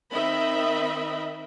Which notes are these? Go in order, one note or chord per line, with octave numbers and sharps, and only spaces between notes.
D#3 C4 D#5 E5 B5